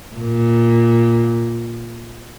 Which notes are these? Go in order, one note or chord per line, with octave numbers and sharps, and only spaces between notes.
A#2